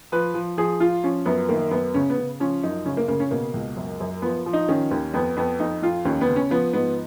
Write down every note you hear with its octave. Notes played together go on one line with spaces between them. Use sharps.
F3 B4
F3
F3 G#4
F3 F4
F3 C#4
F#2 B3
D#3 A#3
F#2 B3
C#3 C#4
B3
C#3
F3 C#4
F#2 D#4
C#3 C#4
A#3
C#3 A#3
C#4
B2 A#3
C#2
F#2
F#2
F3 B3
F3
D#4
D#3 C#4
D#2
F2 B3
F2 B3
F2 D#4
F2 F4
D#2 C#4
B3
C#3
C#4
F3 B3
G#2 B3